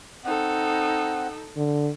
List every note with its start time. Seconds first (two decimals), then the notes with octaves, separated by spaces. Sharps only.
0.25 C4 D#4 A4 F#5
1.57 D3